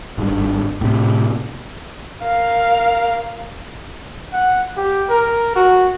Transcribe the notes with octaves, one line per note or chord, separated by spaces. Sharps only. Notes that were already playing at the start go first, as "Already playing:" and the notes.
G#1 G2
A2 C3
A#4 F5
F#5
G4
A#4
F#4